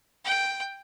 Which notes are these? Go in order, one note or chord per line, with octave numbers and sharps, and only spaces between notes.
G5